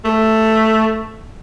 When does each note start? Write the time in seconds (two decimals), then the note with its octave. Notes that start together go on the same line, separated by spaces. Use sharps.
0.04 A3